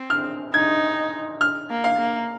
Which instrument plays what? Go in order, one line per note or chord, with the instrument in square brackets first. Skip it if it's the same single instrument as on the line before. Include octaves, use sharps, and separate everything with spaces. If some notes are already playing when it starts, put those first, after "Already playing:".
Already playing: [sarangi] C4
[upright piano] F6
[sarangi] D#4 [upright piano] G#6
[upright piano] F6
[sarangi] A#3
[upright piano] F5
[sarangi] A#3